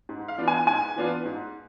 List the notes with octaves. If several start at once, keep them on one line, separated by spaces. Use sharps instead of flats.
G#2
F5
E3 B3 D4 F4
G#5
G#2 G#5
E3 B3 D4 F4
G#2